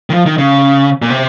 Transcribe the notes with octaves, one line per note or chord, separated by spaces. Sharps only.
D#3
F3
D#3
C#3
A#2
C3